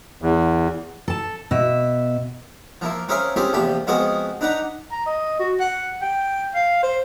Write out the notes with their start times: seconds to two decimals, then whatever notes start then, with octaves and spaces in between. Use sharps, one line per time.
0.22 E2
1.08 A4 A5
1.51 B2 E5
2.81 F3 A#3 E4
3.08 C4 C#4 G#4 A#4 E5 F5
3.36 C4 C#4 E4 F4 G4 G#4
3.53 A#1 E2 C3 F3 G4 B5
3.87 F3 G#3 B3 C4 F#4 G#4
4.41 D4 D#4 B4 F#5 A#5
4.91 A#5
5.06 D#5
5.39 F#4
5.60 F#5
6.02 G5
6.54 F5
6.83 C5